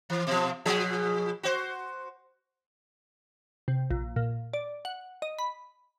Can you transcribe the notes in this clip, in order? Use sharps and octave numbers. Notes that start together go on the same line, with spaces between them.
E3
B2 F3
B2 F3 G#4
F#4 C5
C3
A#1
A#2
D5
F#5
D#5
B5